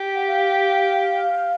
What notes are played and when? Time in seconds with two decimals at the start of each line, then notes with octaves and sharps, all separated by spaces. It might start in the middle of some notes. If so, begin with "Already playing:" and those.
Already playing: G4
0.15 F#5
0.27 F5